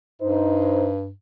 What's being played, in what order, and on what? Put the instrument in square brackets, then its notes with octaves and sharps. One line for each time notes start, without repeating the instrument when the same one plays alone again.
[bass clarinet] G2 [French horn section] D#4 C5